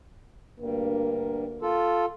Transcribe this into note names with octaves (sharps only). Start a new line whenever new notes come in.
D2 G2 A#3 A#4
F4 A4